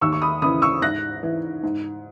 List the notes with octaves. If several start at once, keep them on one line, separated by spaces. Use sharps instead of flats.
D#2 C#6 E6
C#6
B5 D#6
C#3 E3 B5 D#6
C#6 E6
G#2 F#6 A#6
E3
G#2